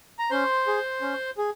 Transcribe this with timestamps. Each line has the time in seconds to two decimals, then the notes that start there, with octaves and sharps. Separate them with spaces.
0.19 A#5
0.31 C#4 C5 C6
0.67 G#4
1.01 C#4
1.38 G#4